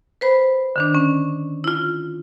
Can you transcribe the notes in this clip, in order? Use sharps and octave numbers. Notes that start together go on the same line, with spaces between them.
B4 C5 B5
D3 D#3 D4
C#4
E4 F4